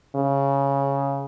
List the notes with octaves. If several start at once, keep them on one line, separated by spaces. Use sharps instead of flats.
C#3